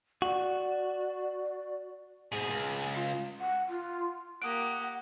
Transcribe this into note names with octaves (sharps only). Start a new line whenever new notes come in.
F#4 D5
G#2 B2 G#4
C#2
F4 F5
F#5
F4
A#3 G4 F#5 D#6 F#6 D7